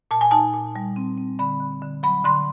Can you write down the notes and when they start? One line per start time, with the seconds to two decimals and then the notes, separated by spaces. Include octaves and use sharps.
0.11 A#2 A5
0.21 G#5
0.31 D#4 A5
0.53 A#2
0.76 G3
0.96 C4
1.17 C4
1.39 D3 B5
1.60 D3
1.82 D3
2.03 F#3 B5
2.24 D3 C6